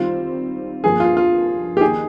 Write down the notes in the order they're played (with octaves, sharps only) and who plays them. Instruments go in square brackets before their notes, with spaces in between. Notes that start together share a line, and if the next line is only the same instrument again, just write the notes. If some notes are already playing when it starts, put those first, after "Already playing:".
Already playing: [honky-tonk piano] D#3 G3 C4 [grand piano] F4
[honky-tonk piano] G2 F3 A#3 [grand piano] G#4
[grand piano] F4
F4
G4
[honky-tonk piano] D#3 A#3 D#4 [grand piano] G#4